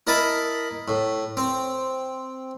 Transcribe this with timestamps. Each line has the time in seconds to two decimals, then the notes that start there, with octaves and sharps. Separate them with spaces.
0.07 E4 A#4 D#5 A5 B5
0.88 A2
1.37 C4